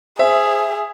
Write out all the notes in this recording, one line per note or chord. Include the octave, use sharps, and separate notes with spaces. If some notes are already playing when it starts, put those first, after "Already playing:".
G#4 C5 E5